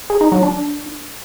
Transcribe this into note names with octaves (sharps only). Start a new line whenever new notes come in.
G#4
D#4
F#3
D4